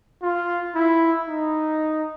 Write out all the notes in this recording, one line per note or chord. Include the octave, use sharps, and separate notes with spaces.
F4
E4
D#4